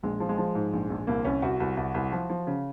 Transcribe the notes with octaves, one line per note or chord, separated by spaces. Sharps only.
A#1 G#3
F3
G#3
F3
G#2
A#1
A#1
C2 A#3
C2 C#4
C2 F#4
C2
C2
C2
F3
F3
C#3